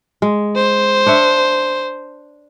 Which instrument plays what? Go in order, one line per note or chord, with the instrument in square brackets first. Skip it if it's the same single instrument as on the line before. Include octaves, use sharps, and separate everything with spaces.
[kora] G#3
[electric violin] C5
[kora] D4 C#5 E5